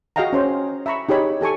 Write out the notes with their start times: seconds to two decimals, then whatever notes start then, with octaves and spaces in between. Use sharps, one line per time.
0.16 F#4 G#4 D#5 F5 G5 A#5
0.33 C#4 C5 C#5
0.86 E5 A#5 B5 C#6
1.09 D#4 G4 G#4 C#5 B5
1.41 G4 A4 G#5 C#6